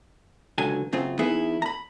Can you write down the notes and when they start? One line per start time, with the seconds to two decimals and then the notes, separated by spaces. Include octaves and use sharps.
0.58 C#2 D3 F#3 G#5
0.93 F#2 C#3 C4 F4
1.19 E3 B3 D#4 E4 G#4 B4
1.62 A#5 B5